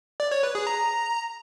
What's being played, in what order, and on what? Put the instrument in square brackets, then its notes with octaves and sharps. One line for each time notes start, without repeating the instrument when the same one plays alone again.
[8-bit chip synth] D5
C#5
B4
G#4
A#5